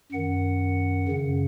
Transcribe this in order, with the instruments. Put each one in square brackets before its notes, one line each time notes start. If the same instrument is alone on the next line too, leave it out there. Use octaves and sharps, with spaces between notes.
[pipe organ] F#2 D#3 F#5
F#2 C#3